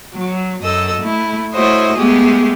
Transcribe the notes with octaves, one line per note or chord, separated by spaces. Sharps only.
F#3
F#2 A4 D#5 E6
A3 E4
A3 E4 F#4 C5 C#5 D#5
G#3 A3 B3 G4 G#4